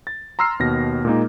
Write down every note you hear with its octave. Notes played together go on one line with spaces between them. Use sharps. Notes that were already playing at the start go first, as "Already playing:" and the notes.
A6
A#5 C6 E6 F6 C7
D#2 B2 A#6
A#2 G#3 A#3 D#4